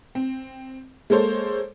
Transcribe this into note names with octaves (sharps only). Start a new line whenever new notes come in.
C4
G#3 A#3 A4 C5 C#5